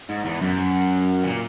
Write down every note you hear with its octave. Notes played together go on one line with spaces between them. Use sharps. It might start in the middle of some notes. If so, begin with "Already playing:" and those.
G#2
E2
F#2
A#2